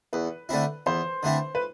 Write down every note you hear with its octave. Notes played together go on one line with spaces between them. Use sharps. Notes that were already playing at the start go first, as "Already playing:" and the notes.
E2 B4
D3 A3 C4 E4
E2 C5
D3 A3 C4 E4
B4